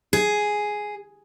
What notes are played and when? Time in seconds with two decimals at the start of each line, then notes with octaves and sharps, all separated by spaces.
0.13 G#4